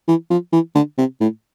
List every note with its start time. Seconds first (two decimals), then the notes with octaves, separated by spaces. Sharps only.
0.08 E3
0.30 F3
0.52 E3
0.75 D3
0.98 C3
1.20 A2